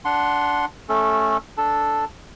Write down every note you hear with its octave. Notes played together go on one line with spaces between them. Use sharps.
D4 F#5 C6
A3 C#4 A4
D4 A4 A5